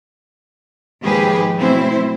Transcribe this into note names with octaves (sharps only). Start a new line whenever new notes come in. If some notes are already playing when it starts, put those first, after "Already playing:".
D#2 G#2 F3 G4 G#4 B4
B2 F#3 A3 C4 E4 C5